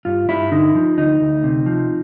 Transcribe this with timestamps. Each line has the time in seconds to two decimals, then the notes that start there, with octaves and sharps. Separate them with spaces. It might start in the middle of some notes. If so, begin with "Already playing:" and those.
0.05 G2 F4
0.29 G2 E4
0.51 D3 D#4
0.75 F3
0.98 D2 D#4
1.21 D2
1.44 C3
1.66 F3